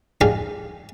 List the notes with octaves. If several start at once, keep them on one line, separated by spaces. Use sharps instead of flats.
D4 D#4 G4 G#4 D5 F5